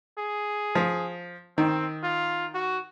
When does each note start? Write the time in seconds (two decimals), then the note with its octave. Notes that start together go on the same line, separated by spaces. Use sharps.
0.18 G#4
0.75 F3
1.58 D#3 C4
2.03 F4
2.55 F#4